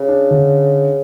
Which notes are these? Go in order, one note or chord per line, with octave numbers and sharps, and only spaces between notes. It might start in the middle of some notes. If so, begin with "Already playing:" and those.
Already playing: C#3
D4
D3